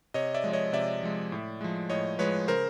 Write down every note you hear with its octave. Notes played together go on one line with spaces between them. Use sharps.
C3 C#5 D#5
D5 E5
F3 G#3
C#5 D#5
C3 D5 E5
F3 G#3
A2
F3 G#3
A2 C#5 D#5
F3 G#3 B4 C#5
C#3 A#4 C5